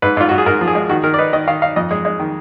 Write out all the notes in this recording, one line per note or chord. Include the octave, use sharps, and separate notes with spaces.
G#2 B4
G#2 F4
G#2 F#4
G#4
G#2 A#4
F3
G#4
G#3
D#3 F#4
D#3 A#4
D5
D#4 B4
D#3 D#5
D#3 F5
D#4 F5
F2 D#5
G#3
G#3
D#3